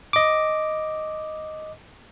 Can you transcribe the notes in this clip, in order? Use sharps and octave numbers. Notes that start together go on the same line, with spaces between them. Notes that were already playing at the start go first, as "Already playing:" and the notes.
D#5 D6